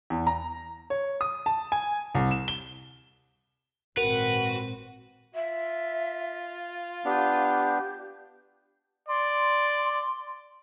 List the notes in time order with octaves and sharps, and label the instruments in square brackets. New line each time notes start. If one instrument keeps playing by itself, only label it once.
[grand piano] E2
A#5
C#5
D#6
A5
G#5
C2
E7
G7
[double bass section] G#1 A#2 C4 [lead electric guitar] F#4 [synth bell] A#4 [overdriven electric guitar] B4
[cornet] F4 [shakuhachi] E5
[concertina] B3 D4 [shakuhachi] G4
[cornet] D5 [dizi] C6